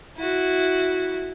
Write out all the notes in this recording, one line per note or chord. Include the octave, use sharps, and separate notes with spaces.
E4 F#4